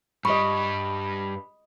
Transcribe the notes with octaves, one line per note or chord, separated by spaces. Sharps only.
G2 G3 D#5 B5 C#6